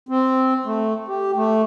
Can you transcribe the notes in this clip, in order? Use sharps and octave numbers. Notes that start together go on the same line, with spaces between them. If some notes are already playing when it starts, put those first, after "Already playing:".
C4
A3
G4
A3